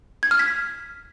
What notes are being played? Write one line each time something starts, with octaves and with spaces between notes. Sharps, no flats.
G#6
F6
B6